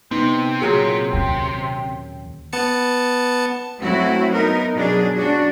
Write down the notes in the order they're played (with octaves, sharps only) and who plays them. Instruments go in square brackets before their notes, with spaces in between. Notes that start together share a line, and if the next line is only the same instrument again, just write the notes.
[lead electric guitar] C3 [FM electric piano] B3 D#4
[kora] A#2 C#3 F#3 [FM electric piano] G#4
[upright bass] D#2 [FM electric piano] G5
[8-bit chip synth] B3 A5 C#7
[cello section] F#3 A3 C4 E4 F#4
B3 D#4 A#4
B2 F#3 D4 G#4
D4 F#4